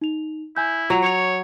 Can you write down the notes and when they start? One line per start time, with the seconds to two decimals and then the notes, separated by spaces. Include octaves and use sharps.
0.01 D#4 F7
0.57 E4 G#5 G6
0.90 F#3 F4 F7
1.02 C#5 C#7 F7